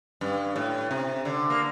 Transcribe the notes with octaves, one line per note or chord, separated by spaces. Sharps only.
G2
A2
C3
D3
A#3